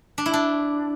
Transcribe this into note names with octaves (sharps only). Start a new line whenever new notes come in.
D4
E4
D4